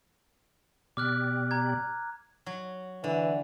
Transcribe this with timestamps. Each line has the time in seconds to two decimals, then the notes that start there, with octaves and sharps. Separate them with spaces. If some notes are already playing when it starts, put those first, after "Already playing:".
0.97 B2 G4 D5 D6 F6 F#6
1.51 A#5 G#6
2.46 F#3
3.04 D3 E3